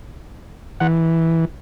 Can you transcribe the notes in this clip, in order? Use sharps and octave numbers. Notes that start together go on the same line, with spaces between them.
E3 F#5